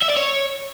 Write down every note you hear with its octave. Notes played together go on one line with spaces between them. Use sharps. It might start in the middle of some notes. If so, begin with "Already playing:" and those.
E5
D5
C#5